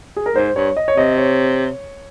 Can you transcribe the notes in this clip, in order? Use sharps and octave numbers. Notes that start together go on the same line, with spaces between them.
G#4
A#4
G#2 C5
G2 C#5
D#5
C#5
C3 D#5
C#5